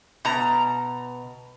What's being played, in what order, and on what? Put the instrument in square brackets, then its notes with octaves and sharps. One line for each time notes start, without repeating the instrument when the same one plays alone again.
[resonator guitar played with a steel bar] B2 A#5